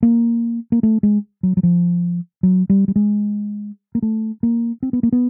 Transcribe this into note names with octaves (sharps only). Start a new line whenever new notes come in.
A#3
A#3
A3
G#3
F#3
F#3
F3
F#3
G3
G3
G#3
A#3
A3
A#3
C4
B3
A#3
B3